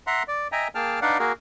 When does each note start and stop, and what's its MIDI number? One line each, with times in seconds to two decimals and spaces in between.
0.07 0.23 76
0.07 0.23 78
0.07 0.23 82
0.07 0.23 84
0.28 0.48 74
0.52 0.68 75
0.52 0.68 76
0.52 0.68 79
0.52 0.68 80
0.52 0.68 82
0.75 1.00 58
0.75 1.00 68
0.75 1.00 79
0.75 1.00 81
0.75 1.00 89
1.02 1.18 62
1.02 1.18 63
1.02 1.18 71
1.02 1.18 74
1.02 1.18 77
1.02 1.18 78
1.19 1.32 58
1.19 1.32 66
1.19 1.32 68
1.19 1.32 70